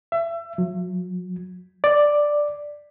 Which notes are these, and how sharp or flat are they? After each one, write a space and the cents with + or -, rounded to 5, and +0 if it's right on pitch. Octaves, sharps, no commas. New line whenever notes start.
E5 +30
F#3 -40
D5 +5